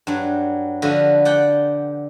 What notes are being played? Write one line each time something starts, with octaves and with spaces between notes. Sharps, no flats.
G2 F#3
D3 F3 F#4 B4
D5 F#5 G5